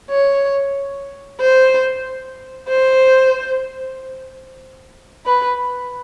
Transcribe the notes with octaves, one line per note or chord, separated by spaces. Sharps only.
C#5
C5
C5
B4